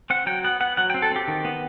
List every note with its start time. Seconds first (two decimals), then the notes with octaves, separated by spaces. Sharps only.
0.10 C4 F#5
0.26 F#3 G5
0.44 B3 F#5
0.60 B3 F#5
0.77 F#3 F#5
0.90 G5
0.94 C4
1.02 A4
1.11 C4 G4
1.28 D#3
1.45 B3